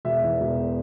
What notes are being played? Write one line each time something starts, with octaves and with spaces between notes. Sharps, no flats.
E1 E5
E2
E1